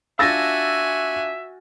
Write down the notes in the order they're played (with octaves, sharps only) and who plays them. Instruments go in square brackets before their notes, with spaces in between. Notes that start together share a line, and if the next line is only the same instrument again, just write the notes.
[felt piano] D4 F4 [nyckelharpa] F#4 G#5 [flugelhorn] E5 [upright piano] E6 A6 A#6